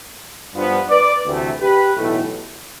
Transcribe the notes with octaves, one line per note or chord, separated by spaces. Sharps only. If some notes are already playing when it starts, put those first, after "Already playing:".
G2 F3 B3
B4 D5
D2 C3 E3 A3
G4 B4
B1 A2 E3 A3